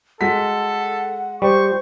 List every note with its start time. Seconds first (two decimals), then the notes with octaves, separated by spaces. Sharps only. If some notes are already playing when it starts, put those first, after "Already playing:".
0.21 G#3 F#4 A4 F#5 B6
1.42 G3 C5 C#6